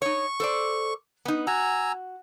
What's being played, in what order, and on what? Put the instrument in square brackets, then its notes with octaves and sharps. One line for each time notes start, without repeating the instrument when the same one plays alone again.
[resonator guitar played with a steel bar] D#4 C#5 [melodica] C#6
[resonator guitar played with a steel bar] A4 C5 D5
B3 D#4
[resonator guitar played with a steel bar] F#4 [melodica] G#5 A#5 E6